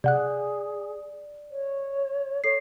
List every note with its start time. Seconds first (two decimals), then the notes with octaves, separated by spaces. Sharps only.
0.04 C3 G#4 D5 F#5 F#6
1.50 C#5
2.44 A4 C#5 C7